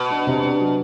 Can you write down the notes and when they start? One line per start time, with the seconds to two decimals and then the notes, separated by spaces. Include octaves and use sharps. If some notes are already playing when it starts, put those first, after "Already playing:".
Already playing: B2
0.10 D4
0.27 C3
0.43 D4
0.60 F#3